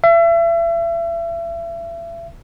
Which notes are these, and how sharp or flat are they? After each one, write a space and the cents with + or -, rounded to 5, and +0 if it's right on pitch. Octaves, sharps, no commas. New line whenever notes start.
E5 +35